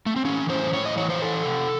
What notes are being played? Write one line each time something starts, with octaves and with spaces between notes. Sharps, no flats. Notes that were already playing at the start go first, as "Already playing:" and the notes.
A3
C4
E3 C#4
A2 C5
A2 C#5
D#5
E3 C#5
C5
E3 A4
C3